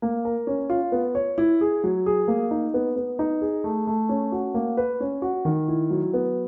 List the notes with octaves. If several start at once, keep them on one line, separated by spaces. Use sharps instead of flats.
A#3
A#4
C#4
F4
B3
C#5
E4
G#4
F#3
G#4
A#3
D#4
B3
B3
D#4
G#4
A3
A3
C#4
F#4
A#3
B4
C#4
F#4
D#3
E4
F#3
B3